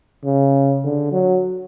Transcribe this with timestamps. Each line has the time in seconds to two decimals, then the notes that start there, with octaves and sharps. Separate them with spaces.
0.24 C#3
0.84 D3
1.12 F#3